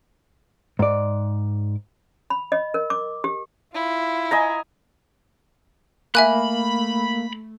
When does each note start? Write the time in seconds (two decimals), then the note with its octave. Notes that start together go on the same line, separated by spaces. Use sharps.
0.79 G#2 D5
2.30 B5
2.52 D#5
2.74 A#4
2.90 D6
3.24 G4
3.74 E4 F4
4.31 D#5 G#5 A#5
6.15 A3 A#3 E5 G#5 B5 F#6